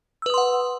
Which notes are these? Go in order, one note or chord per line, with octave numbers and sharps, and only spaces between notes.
B4 F#5 C6 D#6 E6